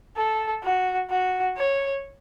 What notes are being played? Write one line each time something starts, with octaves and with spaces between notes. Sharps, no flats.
A4
F#4
F#4
C#5